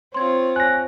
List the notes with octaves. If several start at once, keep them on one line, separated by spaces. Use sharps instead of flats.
C4 F4 C#5 C6 G#6
G#5 F#6 A#6